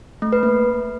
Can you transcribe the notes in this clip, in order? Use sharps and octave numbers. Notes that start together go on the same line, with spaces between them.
A3
B4
A#3